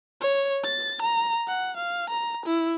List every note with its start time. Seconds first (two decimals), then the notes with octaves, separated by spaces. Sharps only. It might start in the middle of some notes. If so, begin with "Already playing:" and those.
0.21 C#5
0.64 A6
1.02 A#5
1.48 F#5
1.77 F5
2.10 A#5
2.46 E4